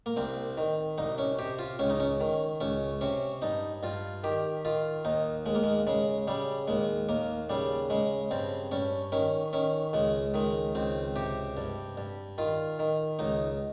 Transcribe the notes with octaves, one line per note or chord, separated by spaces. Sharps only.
A#3
C2 C4
D#3
C2 D#4
C#4
C3 G4
F4
C#2 C#4
D#4
C#4
D#3
C#2 C#4
C3 C#4
G2 D#4
G2 F4
D#3 G4
D#3 F4
D#2 D#4
D#2 G#3
A#3
G#3
C#3 G#3
C#3 G3
D#2 G#3
D#2 A#3
C#3 G3
C#3 G#3
G2 C4
G2 C#4
D#3 C#4
D#3 C#4
C#2 G#3
D#3 G#3
C#2 C4
C3 G4
G2
G2
D#3 F4
D#3
C#2 D#4